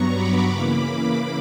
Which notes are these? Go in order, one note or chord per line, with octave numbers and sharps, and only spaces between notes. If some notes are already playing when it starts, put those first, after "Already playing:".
Already playing: G2 F#3 B3 A#5 C#6
B5 D6
C#3 E3 A#3